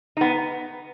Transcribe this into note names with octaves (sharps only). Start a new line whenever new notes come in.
B3 D#4